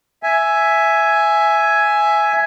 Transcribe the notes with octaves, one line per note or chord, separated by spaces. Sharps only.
E5 G#5